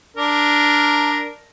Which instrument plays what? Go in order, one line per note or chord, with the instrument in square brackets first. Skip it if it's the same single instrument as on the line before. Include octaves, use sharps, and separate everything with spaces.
[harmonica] D4 A#4